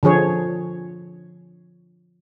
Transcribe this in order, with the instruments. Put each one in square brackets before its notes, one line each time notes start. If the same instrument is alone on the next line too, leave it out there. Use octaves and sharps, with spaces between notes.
[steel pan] D3 F3 G#4 C#5